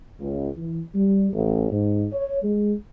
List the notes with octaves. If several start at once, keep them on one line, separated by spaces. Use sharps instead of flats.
C#2
E3
G3
A1
G#2
C#5
G#3